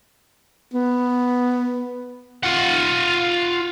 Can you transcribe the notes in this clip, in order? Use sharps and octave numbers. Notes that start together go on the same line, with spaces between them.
B3
F4 F#5